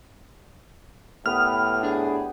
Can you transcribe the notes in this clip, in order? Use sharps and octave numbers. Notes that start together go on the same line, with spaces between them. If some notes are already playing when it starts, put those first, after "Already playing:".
A2 B3 G4 B4 F6
D4 G#4